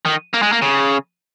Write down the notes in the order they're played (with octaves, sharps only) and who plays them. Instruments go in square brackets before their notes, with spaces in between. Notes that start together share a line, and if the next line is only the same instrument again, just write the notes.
[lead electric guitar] D#3
A#3
G#3
A#3
C#3